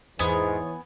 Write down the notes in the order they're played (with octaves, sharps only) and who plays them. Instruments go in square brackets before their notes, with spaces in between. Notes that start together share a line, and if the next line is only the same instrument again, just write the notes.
[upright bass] E2 [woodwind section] G#2 [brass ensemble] E3 C#5 [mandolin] B3 G#5